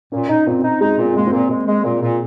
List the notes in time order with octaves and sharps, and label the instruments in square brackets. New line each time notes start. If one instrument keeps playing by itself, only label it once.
[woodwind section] A#2 [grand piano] C#4
[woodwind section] D#4
[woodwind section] A#2 [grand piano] C4
[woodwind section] D#4
[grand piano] G#3 [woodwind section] D#4
[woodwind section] A#2
[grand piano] C4
[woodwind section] G#3 [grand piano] A#3
[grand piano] C4
[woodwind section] A#2
G#3
G#3
A#2
A#2